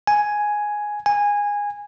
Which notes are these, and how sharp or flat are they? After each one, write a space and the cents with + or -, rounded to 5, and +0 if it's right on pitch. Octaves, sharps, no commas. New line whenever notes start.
G#5 +5
G#5 -15